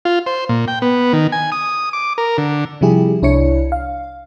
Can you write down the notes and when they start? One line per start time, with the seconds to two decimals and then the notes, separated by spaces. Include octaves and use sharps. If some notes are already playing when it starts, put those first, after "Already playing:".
0.05 F4
0.26 C5
0.49 A#2
0.68 G5
0.82 B3
1.13 D#3
1.32 G#5
1.52 D#6
1.93 D6
2.18 A#4
2.38 D3
2.81 C3 F3 G3 E4 G4 G#4
3.22 C2 D4 E4 C#5 C#7
3.72 F5